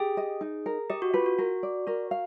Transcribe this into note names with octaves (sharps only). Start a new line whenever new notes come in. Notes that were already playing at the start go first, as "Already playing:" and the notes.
Already playing: G4 G#4
D#5
D#4
A#4
G4 D#5
F#4
F4 B4
F#4
F#4 A#4
D5
F#4 A#4
F5